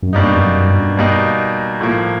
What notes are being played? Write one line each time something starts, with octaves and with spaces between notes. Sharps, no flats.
F#2
G2 B2 G3 A#3 D#4
F2
F#2
G2
B2 G3 A#3 D#4
A2 F3 A#3